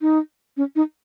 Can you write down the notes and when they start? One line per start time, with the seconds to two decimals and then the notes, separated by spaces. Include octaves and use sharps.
0.01 D#4
0.57 C#4
0.76 D#4